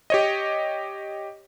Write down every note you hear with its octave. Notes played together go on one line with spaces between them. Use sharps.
G4 C#5 D#5